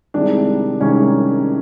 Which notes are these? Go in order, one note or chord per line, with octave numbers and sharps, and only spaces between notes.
C2 C3 D#3 G#3 D4
C2 C3 D#3 G#3 C#4